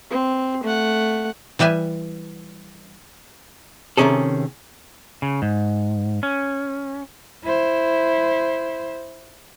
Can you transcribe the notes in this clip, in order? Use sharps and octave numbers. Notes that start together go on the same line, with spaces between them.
C4
A3 F#5
E3 G3 B4 E5 G#5
C3 D#3 C#4 G#4 A4
C#3
G#2
C#4
E4 C5